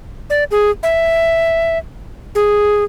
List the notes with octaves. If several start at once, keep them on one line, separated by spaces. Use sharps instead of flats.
D5
G#4
E5
G#4